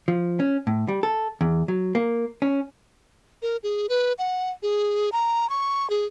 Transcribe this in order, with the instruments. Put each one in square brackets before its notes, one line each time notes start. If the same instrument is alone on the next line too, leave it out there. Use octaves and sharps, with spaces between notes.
[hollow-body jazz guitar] F3
C#4
A2
G3
A4
E2
F#3
A#3
C#4
[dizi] A#4
G#4
B4
F#5
G#4
A#5
C#6
G#4